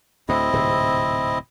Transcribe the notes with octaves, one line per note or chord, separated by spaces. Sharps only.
D2 A2 C4 E4 D#5
D1 G#2 C3